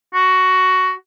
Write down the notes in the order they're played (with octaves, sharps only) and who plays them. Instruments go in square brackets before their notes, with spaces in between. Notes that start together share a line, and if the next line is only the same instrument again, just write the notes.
[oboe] F#4